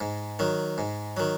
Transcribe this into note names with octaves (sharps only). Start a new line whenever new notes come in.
G#2
D#3 F#3
G#2
D#3 F#3